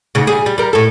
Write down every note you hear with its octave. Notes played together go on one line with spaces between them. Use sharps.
D2 G#2 C#3
G3 G#4
G3
G3 A#4
A2 A4